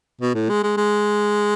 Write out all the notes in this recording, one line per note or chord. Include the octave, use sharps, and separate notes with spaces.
B2
A2
G#3
G#3
G#3